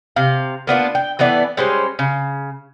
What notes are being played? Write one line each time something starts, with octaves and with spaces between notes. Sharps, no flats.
C3 F5
A#3 B3 D4 F4
G5
E3 A3 B3 D5
G3 G#3 C#4 C5
C#3